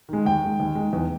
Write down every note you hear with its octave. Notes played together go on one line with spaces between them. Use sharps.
D#3 G#3
D#2 G5
D#3 G#3
D#2
G#3
D#3
E2